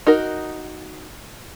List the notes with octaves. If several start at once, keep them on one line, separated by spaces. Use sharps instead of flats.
D#4 F#4 A#4